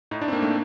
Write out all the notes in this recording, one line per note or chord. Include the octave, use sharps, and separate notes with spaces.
A2 D#4
D4
C4
A#3
A3